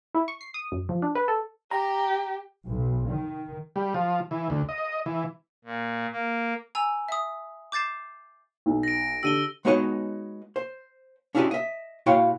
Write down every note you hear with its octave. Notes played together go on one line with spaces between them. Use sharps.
E4
C#6
C7
D#6
F#2
F3
D4
B4
A4
G4 A#5
B1
D#3
G3
F3
E3
D2
D#5
E3
A#2
A#3
G#5 A#5 E6
E5 D#6
D6 G6 A6 C7 E7
B1
A#6 D7
D3 G4 E6 D#7 G7
G#3 B3 D#4 F#4 C#5 D#5
C5
C#4 D4 E4 F#4 G4 D#5
D#5 E5
A#2 E4 F#4 C#5 F5 G5